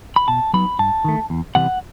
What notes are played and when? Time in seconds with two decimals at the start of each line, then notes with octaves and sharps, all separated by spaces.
0.16 B5
0.28 B2 A5
0.53 F#3 B3 D#4 B5
0.79 G2 A5
1.04 D#3 A3
1.30 E2
1.55 C3 E3 G3 B3 F#5